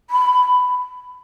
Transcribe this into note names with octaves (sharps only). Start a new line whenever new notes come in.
B5